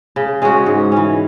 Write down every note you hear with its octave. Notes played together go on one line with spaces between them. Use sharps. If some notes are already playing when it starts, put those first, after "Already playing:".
C#3
G#3 C#4 F#4
G#2
E3 C#4